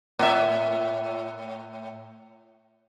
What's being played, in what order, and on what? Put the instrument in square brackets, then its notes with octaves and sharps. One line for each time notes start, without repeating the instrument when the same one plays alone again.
[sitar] A2 E5